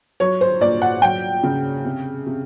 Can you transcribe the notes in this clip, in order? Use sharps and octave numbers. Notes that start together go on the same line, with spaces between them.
F#3 C#5
C5
A#2 D5
F#5
F#3 G5
C#3
C3
C3